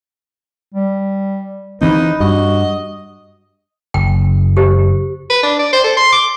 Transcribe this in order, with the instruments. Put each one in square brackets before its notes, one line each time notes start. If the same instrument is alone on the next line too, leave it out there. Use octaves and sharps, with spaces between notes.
[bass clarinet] G3
[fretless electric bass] E3 C4 [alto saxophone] D#4 [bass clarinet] B4
[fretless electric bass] G2 [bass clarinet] F#4 [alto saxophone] D#5
[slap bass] F#1 [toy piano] G5
[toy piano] G4 C5
[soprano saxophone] B4
D4
D5
C5
A4
C6
D6